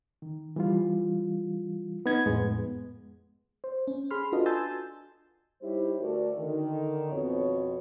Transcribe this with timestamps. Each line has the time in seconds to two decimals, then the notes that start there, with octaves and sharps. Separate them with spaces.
0.22 D#3
0.56 E3 G3 F4
2.06 B3 D#4 G#6
2.26 F2 A2 G#3 B3
3.64 C5
3.87 C#4
4.11 G#4 B5 C6 F6
4.32 D4 F4 F#4 A4 B4 D#5
4.46 G#5 A5 C6 E6 G6 A6
5.62 G3 D#4 E4 G4 C5 C#5
6.00 D2 A3 F#4 A4 A#4 D5
6.37 D3 D#3
7.11 F2 B2 C#5